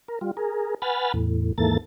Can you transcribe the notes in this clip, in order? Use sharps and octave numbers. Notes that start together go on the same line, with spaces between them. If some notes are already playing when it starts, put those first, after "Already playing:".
A#4
G3 F4
G#4 A#4
B4 F#5 G#5 B5 F6 A6
E2 A2
D#2 G#2 E3 A#3 A4 A6